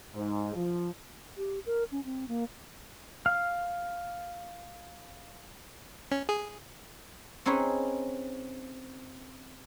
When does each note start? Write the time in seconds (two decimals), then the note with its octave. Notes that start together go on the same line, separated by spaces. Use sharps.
0.14 G#2
0.55 F3
1.37 G4
1.66 A#4
1.92 C#4
2.05 C4
2.28 A#3
3.26 F5 F6
6.11 C#4
6.29 G#4
7.46 C4 C#4 D#4 G#4 B4 C#5